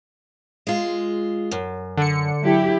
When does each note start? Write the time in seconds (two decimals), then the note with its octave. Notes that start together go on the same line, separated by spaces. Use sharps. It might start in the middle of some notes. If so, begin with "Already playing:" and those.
0.67 G#3 F4
1.51 F#2
1.97 D3 C#7
2.41 F#3 E4 G4